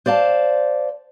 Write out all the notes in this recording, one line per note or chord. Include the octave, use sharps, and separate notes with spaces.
C5 D5 F5 A5